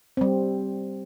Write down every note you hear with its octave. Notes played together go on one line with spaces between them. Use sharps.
G3 C4